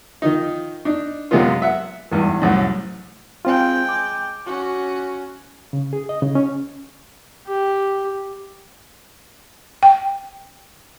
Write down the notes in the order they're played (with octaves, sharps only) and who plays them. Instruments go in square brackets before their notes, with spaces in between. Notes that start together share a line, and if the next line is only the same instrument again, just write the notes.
[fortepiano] D#3 F3 D#4
D4 D#4
F#2 C3 G#3 A#3 B3 F4
E5 F#5
G#1 E2 G2
C2 F#2 A2
[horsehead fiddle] G#3 G5 [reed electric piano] C4 F4
[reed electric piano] D6
[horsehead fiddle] C#4 F#4
[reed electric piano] C#3
G#4
D#5
C#3
C#4
[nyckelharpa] G4
[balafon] G5